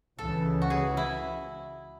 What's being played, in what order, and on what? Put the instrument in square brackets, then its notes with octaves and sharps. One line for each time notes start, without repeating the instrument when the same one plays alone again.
[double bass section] C#2 C#3 E3 [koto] A4
[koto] F#4
G#4
E4